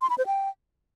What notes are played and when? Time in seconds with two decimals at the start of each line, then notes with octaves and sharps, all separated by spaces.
0.01 C6
0.10 B5
0.18 C5
0.26 G5